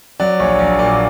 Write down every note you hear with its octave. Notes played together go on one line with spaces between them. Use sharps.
F#3 D5
A#1 C#5
A#1 D5
A#2 D5